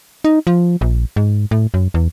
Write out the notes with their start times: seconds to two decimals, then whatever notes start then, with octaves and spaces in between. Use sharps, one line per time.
0.24 D#4
0.47 F3
0.81 A#1
1.16 G#2
1.51 A2
1.74 F#2
1.94 E2